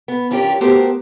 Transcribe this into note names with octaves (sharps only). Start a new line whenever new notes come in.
B3
G2 E3 C#4 F4 G4 A#4
A3 B3 F#4 G4 A#4 C5